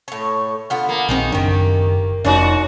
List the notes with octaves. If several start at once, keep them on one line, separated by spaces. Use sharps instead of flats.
A2 C#5
D3 B3 F4
A#3
A#1 D#3 G#3 C4 D#4
F#1 D#3 D4 G4
F1 F3 C#4 D#4 F#4 D5